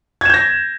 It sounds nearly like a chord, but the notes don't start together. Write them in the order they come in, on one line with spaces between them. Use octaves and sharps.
G#6 E7 G6 A#6